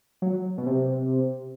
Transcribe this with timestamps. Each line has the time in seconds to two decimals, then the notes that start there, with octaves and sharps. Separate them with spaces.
0.22 F#3
0.58 B2
0.66 C3